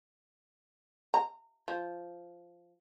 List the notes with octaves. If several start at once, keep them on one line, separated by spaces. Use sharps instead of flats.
A#5
F3